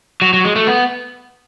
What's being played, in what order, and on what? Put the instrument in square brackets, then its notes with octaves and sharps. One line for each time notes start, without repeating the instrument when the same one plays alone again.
[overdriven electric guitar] F#3
F#3
G#3
A3
B3